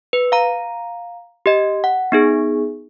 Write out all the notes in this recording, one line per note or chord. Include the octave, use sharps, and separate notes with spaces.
B4
F5 A#5
G4 D#5
F#5
B3 D#4 G#4